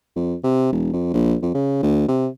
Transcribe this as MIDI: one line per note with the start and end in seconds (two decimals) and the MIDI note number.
0.16 0.35 41
0.44 0.69 48
0.72 0.91 28
0.93 1.12 41
1.14 1.35 34
1.42 1.50 41
1.54 1.78 49
1.83 2.05 38
2.08 2.28 48